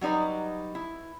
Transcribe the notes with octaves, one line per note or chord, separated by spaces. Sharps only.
F#3 G3 D#4 B4 D#5
E4